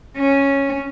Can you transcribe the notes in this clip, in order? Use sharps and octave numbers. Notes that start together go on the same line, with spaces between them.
C#4